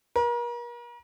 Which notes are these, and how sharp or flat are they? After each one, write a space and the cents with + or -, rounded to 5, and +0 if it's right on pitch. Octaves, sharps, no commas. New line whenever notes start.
A#4 +40